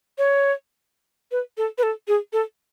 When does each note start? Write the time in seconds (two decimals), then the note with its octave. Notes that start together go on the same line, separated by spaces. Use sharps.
0.18 C#5
1.32 B4
1.58 A4
1.78 B4
1.83 A4
2.08 G#4
2.33 A4